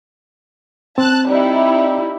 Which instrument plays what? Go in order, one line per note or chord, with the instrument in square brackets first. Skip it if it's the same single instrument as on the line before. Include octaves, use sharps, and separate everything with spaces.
[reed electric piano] C4 [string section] A5 F#6
[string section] G3 D#4 E4